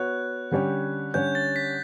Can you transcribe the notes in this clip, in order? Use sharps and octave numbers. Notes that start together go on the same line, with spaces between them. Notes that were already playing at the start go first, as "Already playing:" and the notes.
Already playing: B3 F#4 C#5 F#6
D3 G3 C#4 G4 C#5
D3 G3 C#4 G4 C#5 G6
A6
B6